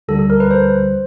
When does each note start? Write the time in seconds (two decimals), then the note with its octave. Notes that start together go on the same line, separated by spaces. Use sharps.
0.08 D2 D3 G3 A4
0.19 A4
0.30 A#4
0.40 B4
0.51 C5